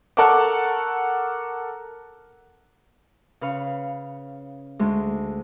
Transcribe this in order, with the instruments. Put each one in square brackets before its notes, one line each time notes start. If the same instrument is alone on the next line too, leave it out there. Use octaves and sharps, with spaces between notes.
[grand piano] A4 A#4 F#5 A5 C#6 D6
[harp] C#3 B4 F5 C#6
D2 G#3